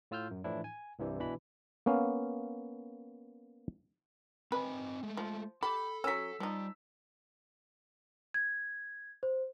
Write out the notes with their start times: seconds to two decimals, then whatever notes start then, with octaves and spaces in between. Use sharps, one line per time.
0.11 A2 F4 E6 F6 G6
0.31 F#2
0.44 A2 E3 F3 D4 E4
0.64 G#5
0.99 C2 G2 C3 E3 G3
1.20 B2 E3 D4 B5
1.86 A#3 B3 C#4 F5
4.52 C4 B4 D#5 G#5
5.03 G#3 A3
5.17 F3
5.63 G4 A4 B5
6.04 F#3 C#4 E6 B6
6.40 F3 G3 D#4
8.34 G#6
9.23 C5